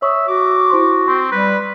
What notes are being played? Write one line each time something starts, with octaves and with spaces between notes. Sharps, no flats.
C#5 E5 C#6 D#6
F#4 D6
E4 C5 C6
C4 C6
G3 B4